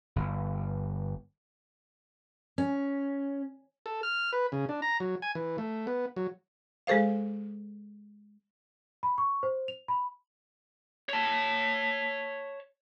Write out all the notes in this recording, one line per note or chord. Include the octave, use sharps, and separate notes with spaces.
G1
C#4
A4
F6
B4
C#3
D4
A#5
F#3
G#5
E3
A3
B3
F#3
G#3 G#4 A4 C5 F5
B5
C#6
C5
F7
B5
C#5 A5